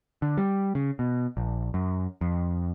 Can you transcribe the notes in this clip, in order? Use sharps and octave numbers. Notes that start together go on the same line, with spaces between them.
D3
G3
C#3
B2
A#1
F#2
F2